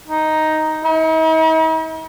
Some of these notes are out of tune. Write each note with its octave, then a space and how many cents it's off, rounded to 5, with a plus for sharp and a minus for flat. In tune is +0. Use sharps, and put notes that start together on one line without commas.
D#4 +5
D#4 +45